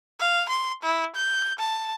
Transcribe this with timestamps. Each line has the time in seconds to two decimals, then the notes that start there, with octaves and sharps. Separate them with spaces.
0.20 F5
0.49 C6
0.83 E4
1.16 G6
1.59 A5